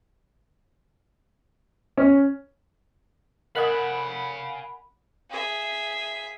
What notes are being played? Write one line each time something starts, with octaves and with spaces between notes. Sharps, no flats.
C#4
A#4 D#5 F5 F#5 G#5 B5 D#6
G#4 E5